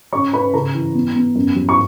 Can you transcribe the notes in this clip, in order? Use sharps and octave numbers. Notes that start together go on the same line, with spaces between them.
C#4 C#5 C#6
C#4 B4 B5
C#3 A#4 A#5
E3
B3
B3
F#2
F#3
C#6